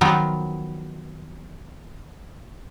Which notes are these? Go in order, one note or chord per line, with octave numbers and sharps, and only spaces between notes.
D#3 F3 F#3 B3